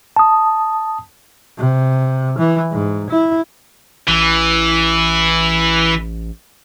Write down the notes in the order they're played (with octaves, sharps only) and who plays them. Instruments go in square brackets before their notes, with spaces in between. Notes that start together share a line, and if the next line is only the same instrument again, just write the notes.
[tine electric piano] A5 D#6
[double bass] C3
E3
G#2
E4
[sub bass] A1 [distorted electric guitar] E3